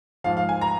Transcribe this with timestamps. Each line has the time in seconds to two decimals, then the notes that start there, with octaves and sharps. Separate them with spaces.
0.24 G#2 F3 F5
0.37 F5
0.49 G#5
0.62 A#5